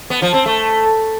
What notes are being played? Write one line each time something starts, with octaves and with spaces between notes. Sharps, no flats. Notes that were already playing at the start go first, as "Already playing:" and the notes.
B3
F3
C4
A3